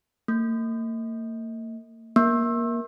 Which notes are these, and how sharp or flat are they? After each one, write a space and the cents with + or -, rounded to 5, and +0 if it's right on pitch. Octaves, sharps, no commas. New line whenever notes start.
A#3 -40
A#3 +15